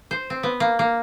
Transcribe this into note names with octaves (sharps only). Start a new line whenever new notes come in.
C5
C4
B3
A#3
A#3